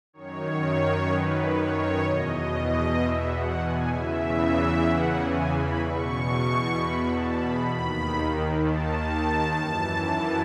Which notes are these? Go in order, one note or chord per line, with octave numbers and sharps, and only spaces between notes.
F#2 D#3 C#5
B4
C#5
E2 B2 D#5
D#5
D#5
E5
F#5
G#5
E2 C#3 E3 E5
F#5
G#5
B5
E2 B2 C#6
B5
A5
B5
D#2 D#3 B5
A5
F#2 E3